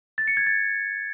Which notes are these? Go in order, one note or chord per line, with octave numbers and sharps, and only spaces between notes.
A6
C#7
G#6
A6